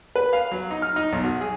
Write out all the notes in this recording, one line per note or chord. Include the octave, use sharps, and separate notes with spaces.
B4
F5
F#3
D#4
F6
D#4
B1
F#4
G#4